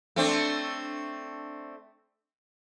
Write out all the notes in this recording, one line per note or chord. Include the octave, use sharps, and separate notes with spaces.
A3 C4 D4